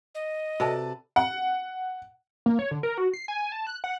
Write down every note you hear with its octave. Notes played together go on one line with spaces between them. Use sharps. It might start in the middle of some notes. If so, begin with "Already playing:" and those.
D#5
C3 F#4 A4 B4 D5 A5
F#5
A#3
C#5
D3
A#4
F#4
C7
G#5
A5
F#6
F#5